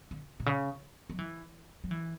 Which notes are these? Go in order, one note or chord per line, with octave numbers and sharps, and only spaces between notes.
D3
B2
C#3
F#3
E3
F#3
E3